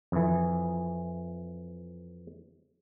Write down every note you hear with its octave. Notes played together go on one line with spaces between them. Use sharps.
F2 E3